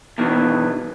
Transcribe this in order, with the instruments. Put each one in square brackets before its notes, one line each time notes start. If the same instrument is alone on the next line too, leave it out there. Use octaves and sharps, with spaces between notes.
[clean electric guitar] E2 G2 B2 D#3 E3